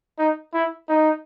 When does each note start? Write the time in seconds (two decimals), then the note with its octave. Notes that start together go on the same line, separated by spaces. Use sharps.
0.19 D#4
0.53 E4
0.89 D#4